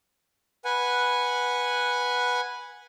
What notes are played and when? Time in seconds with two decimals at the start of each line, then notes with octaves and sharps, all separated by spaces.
0.65 B4 F#5 G#5